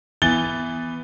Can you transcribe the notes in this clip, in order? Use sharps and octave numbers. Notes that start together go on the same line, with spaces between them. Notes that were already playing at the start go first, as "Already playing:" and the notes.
E3 B3 A6 G7